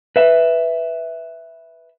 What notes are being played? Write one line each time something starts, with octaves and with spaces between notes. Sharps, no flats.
B4 E5